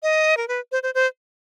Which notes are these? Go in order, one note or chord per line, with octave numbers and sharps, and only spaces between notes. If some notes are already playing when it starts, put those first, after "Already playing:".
D#5
A#4
B4
C5
C5
C5